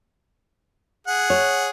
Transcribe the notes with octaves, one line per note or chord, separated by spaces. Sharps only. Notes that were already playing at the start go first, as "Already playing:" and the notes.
G#4 F#5
C#5